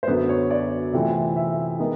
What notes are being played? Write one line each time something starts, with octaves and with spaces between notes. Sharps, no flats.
C5
F#2 D3 F#3 B3 B4
C#5
D5
C3 E3 A3 C4 F4
E5
G#3 B3 D#4 A#4